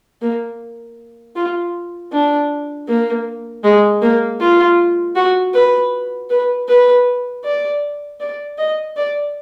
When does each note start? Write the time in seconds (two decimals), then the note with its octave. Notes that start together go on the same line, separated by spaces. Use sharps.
0.22 A#3
1.36 F4
2.12 D4
2.88 A#3
3.64 G#3
4.02 A#3
4.40 F4
5.16 F#4
5.54 B4
6.30 B4
6.68 B4
7.44 D5
8.20 D5
8.58 D#5
8.96 D5